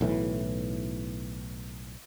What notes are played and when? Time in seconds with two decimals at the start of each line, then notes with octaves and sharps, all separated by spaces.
0.01 B1 A2 E3